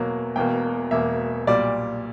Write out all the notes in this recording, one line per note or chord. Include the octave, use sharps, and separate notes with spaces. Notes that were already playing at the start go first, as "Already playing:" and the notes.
Already playing: E2 B2 F#3 A#3
E1 E2 B2 A#3 G5
E1 E2 B2 A#3 E5
B1 A#2 G3 D5